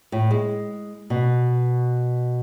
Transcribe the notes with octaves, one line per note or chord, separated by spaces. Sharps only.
A2
G#3
B2